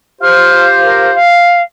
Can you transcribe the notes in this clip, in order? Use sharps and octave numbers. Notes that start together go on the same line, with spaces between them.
F4 G4 C5 F6
A#4
F5